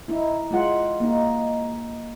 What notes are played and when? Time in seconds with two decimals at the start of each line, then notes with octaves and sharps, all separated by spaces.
0.08 D#4 E4
0.51 G#3 F4 F#5
1.00 A#3 D#4